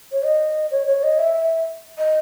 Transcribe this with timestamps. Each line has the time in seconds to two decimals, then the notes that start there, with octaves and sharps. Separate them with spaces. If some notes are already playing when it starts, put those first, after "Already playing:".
0.12 C#5
0.23 D#5
0.71 C#5
0.87 C#5
1.03 D#5
1.19 E5
1.98 D#5